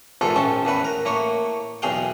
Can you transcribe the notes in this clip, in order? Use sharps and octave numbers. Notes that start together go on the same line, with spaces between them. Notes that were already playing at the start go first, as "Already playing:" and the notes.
A#1 E2 G#2 F4 A4
A#1 C#4 G5 A5
E2 A2 B4 B5
A#4
A2 A#3 C#5
B1 E2 G#4 F5 G5